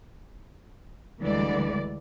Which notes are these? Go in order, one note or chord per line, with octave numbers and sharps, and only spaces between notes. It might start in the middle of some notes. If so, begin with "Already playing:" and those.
D2 D3 E3 G3 G#3 D5